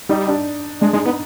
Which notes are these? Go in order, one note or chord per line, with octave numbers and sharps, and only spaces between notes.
G3 D#4
D4
G#3 D4
G#3 D#4
B3 D#4